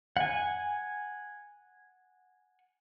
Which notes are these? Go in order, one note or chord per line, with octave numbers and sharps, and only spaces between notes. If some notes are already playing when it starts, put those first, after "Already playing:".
F#5 G#5